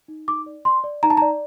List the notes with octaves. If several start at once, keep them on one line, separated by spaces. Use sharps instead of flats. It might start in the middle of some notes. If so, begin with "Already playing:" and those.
D#4
D#4 D6
D5
D5 C6
D5
D#4 A#5
A5
A#5
D5